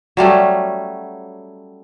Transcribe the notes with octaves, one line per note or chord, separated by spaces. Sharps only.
F#3 G3 A3 C#4